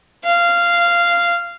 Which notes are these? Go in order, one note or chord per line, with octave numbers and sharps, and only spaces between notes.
F5